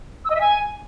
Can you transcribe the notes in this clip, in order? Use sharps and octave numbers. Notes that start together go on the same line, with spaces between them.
E6
D#5
E5
G#5